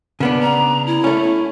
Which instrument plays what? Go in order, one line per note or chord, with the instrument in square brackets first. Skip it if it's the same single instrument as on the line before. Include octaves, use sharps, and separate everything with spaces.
[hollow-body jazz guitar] C#3 B3 D4
[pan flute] A#5
E4
[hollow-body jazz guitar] A3 C#4